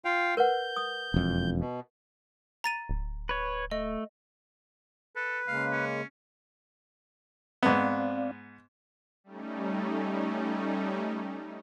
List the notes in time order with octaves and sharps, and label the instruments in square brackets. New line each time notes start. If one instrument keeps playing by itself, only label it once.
[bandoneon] F4 F5 G5
[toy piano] A#4 B4 F#5 [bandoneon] G6
[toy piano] D#6
[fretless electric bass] E1 F2
[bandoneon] B2
[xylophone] A#5 A6 D#7
[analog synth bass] D1
[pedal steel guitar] B4 C#5
[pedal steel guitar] A3 [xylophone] D#5
[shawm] A4 [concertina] B4
[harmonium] C#3 G#3 A#3 [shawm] F5
[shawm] C#4
[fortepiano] G#2 B3 [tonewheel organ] C4 D5 F5
[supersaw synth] G3 A3 C#4 D#4